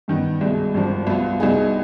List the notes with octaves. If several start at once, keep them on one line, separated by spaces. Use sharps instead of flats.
G2 D#3 B3
C2 B2 G#3
G#1 G2 F3
C2 B2 B3 F4
C2 B2 B3 D#4 G#4